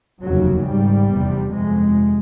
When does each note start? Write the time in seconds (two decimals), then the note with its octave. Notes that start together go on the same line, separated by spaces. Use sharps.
0.23 F1 D#2 C#3 F#3
0.66 G#1 G#2 G3
1.10 F1 E2 C3
1.52 G1 F2 C3 G#3